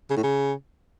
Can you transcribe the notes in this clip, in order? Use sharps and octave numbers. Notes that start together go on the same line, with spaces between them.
C#3
A2
C#3